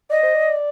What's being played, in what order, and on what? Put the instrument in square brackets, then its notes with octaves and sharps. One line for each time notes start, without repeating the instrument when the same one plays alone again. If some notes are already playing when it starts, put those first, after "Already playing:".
[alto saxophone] D5 [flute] D#5
[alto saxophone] C5
D5